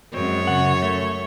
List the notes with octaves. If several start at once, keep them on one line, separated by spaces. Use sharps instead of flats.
F#2 G#3 C4 C#5
C#3 F#5
A3